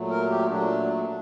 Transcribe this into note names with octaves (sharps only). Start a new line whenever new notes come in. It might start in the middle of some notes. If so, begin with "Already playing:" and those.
Already playing: A#2 F#3 A3
A#4
G4
A#2 F#3 A3 D4
D4